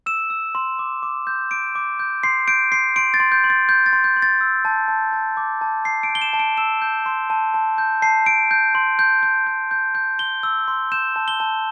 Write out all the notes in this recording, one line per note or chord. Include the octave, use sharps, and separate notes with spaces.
E6 E7
E6
C6
D6
D6
G6
D6 D7
D6
G6
C6 C7
G6 D7
C6 C7
C6 D7
A6
C6
G6
C6
A6
G6
A6
C6
G6
C6
A6
E6
A5
A5
A5
D6
A5
A5 C7
D7
G6
G7
E7
A5
D7
E6 E7
G6
C6
A5
A5
G6
A5 C7
A5 D7
G6
C6
G6
G6
G6
G6
G6
C6 G7
E6
C6
G6 E7
A5
G7
A5